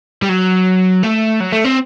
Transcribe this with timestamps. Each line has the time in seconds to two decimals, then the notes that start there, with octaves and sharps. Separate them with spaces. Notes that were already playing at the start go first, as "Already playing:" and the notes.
0.22 G3
0.29 F#3
1.03 A3
1.40 F#3
1.52 A3
1.65 C4